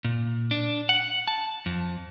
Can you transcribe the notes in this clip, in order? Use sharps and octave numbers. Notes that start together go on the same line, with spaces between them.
A#2
D4
F#5
A5
F2